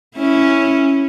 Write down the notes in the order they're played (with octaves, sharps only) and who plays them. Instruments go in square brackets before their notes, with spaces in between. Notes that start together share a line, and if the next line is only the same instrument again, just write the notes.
[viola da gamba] C#4 E4